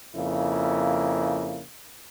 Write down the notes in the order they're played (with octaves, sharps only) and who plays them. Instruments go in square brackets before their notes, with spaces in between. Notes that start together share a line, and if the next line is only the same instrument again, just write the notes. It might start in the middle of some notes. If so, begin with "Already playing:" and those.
[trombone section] F2 C#3 A#3 E4